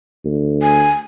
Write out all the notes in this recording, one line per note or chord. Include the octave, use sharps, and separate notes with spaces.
D2
G#5